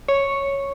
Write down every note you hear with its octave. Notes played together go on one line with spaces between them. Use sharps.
C#5